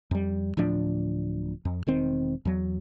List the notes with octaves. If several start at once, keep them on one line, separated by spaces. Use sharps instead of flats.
F2 G3
D1 A2 F3 D4
F2
E1 D#3 C4
E2 F#3